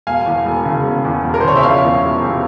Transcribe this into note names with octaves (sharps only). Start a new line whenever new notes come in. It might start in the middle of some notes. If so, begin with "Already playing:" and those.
E1 F5 G#5
E2
E1
C#3
E1
E2
E1
A#4
C5
C#3 C#5
E5
F3 C#5 F5
E2
E1
C3